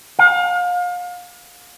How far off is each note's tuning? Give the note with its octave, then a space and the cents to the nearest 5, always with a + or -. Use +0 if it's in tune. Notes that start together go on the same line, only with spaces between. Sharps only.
F5 +35